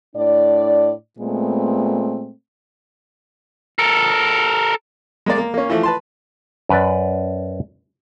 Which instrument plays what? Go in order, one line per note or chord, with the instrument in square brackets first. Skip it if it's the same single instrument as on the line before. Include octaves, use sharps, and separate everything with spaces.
[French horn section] A2 D4 D5
A#2 G#3 A3 B3 C4
[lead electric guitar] A4 A#4
[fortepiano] G#3 A#3 D5
A#3
A#3 C#4
E3 F3 A3
B4 A5 C6
[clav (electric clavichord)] F#2 B4 D5